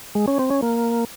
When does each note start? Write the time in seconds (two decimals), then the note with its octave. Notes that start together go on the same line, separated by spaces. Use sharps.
0.15 G#3
0.28 C#4
0.39 C4
0.50 C#4
0.62 A#3